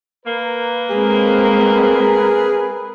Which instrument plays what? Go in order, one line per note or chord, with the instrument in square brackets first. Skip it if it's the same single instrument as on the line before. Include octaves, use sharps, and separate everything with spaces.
[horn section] A#3 [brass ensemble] A#4 B4
[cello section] G#3 C4 [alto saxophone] G#4